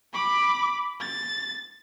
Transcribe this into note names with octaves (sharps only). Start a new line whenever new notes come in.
B5 D6
A6